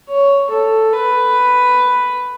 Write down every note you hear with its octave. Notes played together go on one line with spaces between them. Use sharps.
C#5
A4
B4